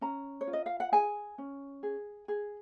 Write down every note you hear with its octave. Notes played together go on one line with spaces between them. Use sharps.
C#4 A#5
C#5
F4
D#5
F5
F#5
G#4 G#5
C#4
G#4
G#4